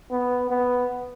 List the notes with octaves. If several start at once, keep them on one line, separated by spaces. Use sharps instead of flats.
B3
B3